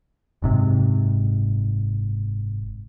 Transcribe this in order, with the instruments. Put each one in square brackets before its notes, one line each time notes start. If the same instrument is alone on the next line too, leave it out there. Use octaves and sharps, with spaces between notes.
[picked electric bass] F#1 G#2 C3